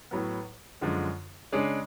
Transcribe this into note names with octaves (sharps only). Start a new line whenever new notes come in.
A2 F#3 B3
F#2 D3 F3 G#3
C#3 G#3 D4 G#4 C#5